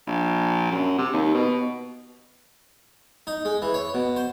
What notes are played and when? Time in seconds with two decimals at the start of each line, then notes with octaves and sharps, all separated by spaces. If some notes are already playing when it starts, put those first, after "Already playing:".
0.07 A#1
0.71 F#2
0.98 C3
1.13 D#2
1.35 B2
3.27 D#4
3.45 G#3
3.62 E3
3.74 C#5
3.94 B2
4.16 C5